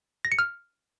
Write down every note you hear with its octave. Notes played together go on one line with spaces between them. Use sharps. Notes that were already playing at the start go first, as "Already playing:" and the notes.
A#6
C#7
F6